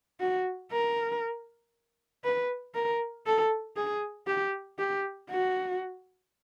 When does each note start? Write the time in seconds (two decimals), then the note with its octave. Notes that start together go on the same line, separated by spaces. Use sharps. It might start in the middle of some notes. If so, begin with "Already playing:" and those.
0.20 F#4
0.71 A#4
2.24 B4
2.74 A#4
3.26 A4
3.76 G#4
4.27 G4
4.78 G4
5.30 F#4